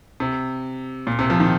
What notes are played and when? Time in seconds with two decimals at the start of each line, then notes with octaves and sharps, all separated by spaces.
0.20 C3
1.07 A#2
1.19 C3
1.30 F3
1.40 D#3